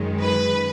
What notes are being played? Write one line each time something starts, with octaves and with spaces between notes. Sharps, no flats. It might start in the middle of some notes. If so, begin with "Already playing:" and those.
Already playing: F#2 D#3 G#3
B4